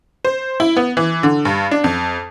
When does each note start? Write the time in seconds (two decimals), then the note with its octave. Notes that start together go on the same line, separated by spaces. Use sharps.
0.25 C5
0.60 E4
0.77 B3
0.97 E3
1.23 D3
1.45 G2
1.71 D4
1.84 F2